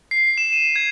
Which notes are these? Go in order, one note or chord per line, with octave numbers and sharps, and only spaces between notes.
C7
E7
D#7
G#6